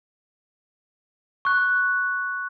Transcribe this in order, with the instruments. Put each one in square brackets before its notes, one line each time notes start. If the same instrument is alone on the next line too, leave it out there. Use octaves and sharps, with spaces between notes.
[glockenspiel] C#6 F#6